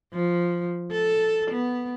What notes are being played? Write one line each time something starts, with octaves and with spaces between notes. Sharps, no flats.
F3
A4
B3